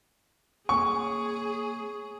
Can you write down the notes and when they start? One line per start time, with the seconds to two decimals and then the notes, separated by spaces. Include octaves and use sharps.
0.69 A#3 G#4 C#5 G#5 C#6